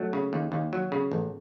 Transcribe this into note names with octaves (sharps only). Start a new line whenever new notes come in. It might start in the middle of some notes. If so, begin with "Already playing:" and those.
Already playing: F#3 A3
C#3
D#2
D#2
F#3
C#3
A1